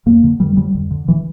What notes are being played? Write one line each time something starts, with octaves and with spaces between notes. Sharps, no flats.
F2 A#3
D3
F2 G3
D3 G3
F2
D3
E3